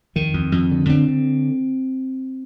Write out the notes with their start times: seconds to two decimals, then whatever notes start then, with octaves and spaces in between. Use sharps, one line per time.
0.16 F2 D#3
0.34 F2
0.52 F2
0.71 D3
0.89 D3 C4
1.08 D3